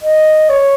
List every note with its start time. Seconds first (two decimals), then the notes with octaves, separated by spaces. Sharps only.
0.02 D#5
0.49 C#5